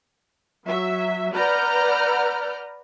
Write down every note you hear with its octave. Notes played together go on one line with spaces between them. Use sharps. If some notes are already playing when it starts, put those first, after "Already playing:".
F#3 E5
B4 D5 F#5 A#5 F6 G6